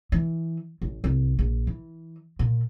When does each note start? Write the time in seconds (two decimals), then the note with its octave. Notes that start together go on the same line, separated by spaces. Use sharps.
0.12 E3
0.82 A1
1.04 C2
1.39 A#1
1.67 E3
2.39 A#2